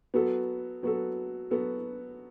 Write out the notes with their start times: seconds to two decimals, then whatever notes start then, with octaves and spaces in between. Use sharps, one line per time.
0.14 F#3 B3 F#4 A4
0.83 F#3 B3 F#4 A4
1.51 F#3 B3 F#4 A4